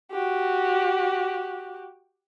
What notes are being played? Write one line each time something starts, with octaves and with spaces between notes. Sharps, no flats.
F#4 G4